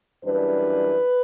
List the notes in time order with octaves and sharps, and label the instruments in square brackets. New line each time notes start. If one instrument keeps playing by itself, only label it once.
[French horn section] F#2 E3 G3 D4 B4